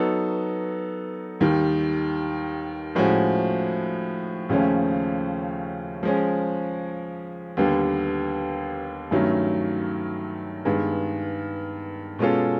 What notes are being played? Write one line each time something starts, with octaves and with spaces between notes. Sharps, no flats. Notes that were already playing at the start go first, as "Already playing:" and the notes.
Already playing: F#3 B3 D#4 F#4 A4
D#2 D#3 G3
A2 F3 G#3 C#4 F#4
D#2 C#3 F3 A3 C#4
F3 G#3 C#4
D#2 D3 G3 B3
G2 D#3 F#3 A3 C#4
G2 D#3 G#3 B3
B2 G#3 C#4 F4 A4